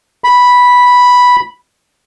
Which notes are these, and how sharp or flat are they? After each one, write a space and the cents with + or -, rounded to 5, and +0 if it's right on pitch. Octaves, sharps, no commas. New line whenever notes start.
B5 -5